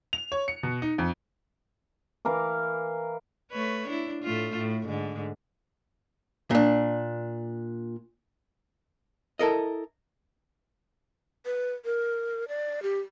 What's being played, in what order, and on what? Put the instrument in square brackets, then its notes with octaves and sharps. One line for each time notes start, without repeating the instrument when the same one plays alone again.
[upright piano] F7
C#5
C#7
B2
D#4
F2
[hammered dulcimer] E3 A#4 F5 D6
[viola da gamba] A3 B4 C#5
D4 E4
A2 A3 F4
A2
G#2 D3
[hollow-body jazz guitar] A#2 D4
E4 A4 A#4 D#5
[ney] B4
A#4
D5
G4